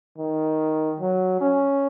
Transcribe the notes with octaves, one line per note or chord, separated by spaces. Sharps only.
D#3
F#3
C#4